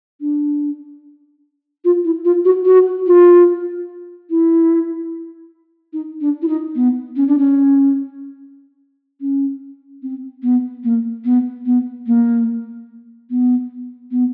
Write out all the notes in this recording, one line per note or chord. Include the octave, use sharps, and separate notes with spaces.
D4
F4
E4
F4
F#4
F#4
F4
E4
D#4
D4
E4
D#4
B3
C#4
D4
C#4
C#4
C4
B3
A#3
B3
B3
A#3
B3
B3